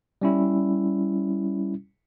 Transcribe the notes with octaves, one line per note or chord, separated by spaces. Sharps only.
G3 C#4 E4